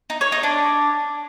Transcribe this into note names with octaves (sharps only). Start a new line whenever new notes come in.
D#4
C#5
D#4
D4